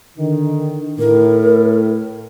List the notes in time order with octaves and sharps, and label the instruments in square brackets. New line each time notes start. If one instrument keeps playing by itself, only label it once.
[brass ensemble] D3 D#3
[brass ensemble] A2 [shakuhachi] A#4